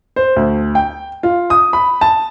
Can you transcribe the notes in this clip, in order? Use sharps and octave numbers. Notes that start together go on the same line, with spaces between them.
C5
D2
G5
F4
D#6
B5
A5